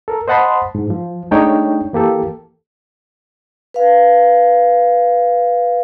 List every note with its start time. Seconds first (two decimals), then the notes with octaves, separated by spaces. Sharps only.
0.08 A4 A#4
0.28 C5 D#5 F#5 A5 B5 C6
0.75 G#2
0.90 F3
1.31 G#3 A3 D4 D#4 C#5 G5
1.93 E3 A#3 G4 A4
3.74 B4 F5